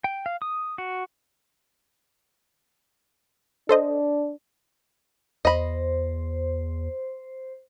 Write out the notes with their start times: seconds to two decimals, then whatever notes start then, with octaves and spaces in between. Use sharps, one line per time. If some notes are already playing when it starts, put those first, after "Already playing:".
0.04 G5
0.26 F5
0.42 D#6
0.78 F#4
3.69 D4 A4 C5 D#5
5.45 E2 C5 D#5 B5